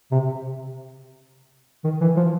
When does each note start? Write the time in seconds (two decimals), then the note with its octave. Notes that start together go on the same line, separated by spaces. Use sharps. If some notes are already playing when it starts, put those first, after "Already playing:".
0.12 C3
1.84 D#3
2.01 E3
2.17 F3